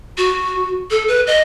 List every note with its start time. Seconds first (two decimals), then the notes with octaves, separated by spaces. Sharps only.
0.18 F#4
0.91 A4
1.08 B4
1.27 D#5